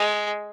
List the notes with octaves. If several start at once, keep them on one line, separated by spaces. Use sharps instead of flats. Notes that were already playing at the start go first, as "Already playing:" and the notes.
Already playing: G#3